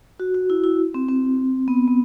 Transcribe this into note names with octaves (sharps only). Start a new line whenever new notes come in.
F#4
F#4
E4
E4
C4
C4
B3
B3